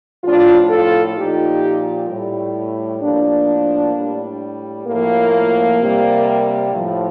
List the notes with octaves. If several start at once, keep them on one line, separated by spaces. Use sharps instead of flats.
A2 F3 D4 F4
F4 A4
A#2 F3 D#4 G4
A2 G3
A2 F3 A#3 D4
A2 G3
A2 F3 A#3
C3 G3
A2 F3